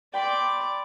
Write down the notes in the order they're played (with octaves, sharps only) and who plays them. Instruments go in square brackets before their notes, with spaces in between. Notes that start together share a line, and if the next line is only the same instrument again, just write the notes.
[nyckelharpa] D5 D6 [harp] G5 B5 C6